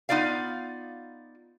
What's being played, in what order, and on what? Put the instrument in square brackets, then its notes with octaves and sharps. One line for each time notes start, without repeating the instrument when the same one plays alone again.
[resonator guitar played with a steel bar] B3 D#4 F4 D5 F5